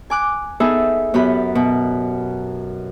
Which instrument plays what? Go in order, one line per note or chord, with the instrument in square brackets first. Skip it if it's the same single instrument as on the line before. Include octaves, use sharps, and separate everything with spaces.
[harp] G#5 D6 F#6
B3 D#4 G#4 A4 B4 E5
F#2 B3 G4 B5
B2